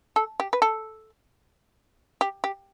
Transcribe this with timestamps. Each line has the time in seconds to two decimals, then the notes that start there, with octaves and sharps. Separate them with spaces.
0.16 A4
0.40 G4
0.53 B4
0.62 A4
2.21 G4
2.44 G4